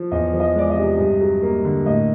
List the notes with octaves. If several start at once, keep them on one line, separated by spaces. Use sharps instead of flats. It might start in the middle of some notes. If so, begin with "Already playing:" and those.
Already playing: F3
E2 D#5
F3
D#5
G#3 D5
D#5
C3
G2
F#3
A#3
D3
A2 D#5